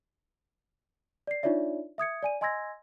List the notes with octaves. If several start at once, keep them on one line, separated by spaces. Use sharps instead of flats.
D5 C7
D4 D#4 F4 C#5 D5 E5
E5 D#6 G#6 C#7
D5 G#5 D#7
D#5 G#5 C6 E6 G#6 A#6